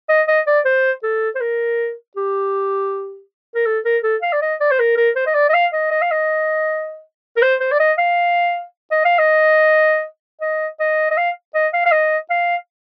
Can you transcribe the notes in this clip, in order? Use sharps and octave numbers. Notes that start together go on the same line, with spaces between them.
D#5
D#5
D5
C5
A4
C5
A#4
G4
A#4
A4
A#4
A4
F5
D5
D#5
D5
C5
A#4
A#4
C5
D#5
D5
D#5
F5
D#5
D#5
F5
D#5
A#4
C5
C5
D5
D#5
F5
D#5
F5
D#5
D#5
D#5
D#5
F5
D#5
F5
F5
D#5
F5